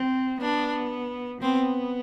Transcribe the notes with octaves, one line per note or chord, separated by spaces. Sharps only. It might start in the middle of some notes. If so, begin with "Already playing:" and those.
Already playing: C4
B3 D4
B3 C4